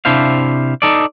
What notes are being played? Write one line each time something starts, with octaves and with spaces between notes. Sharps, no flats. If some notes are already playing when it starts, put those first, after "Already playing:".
C3 D4 E4 C5 F5
D#4 A4 D5